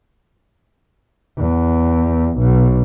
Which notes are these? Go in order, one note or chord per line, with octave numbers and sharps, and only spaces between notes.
E2
B1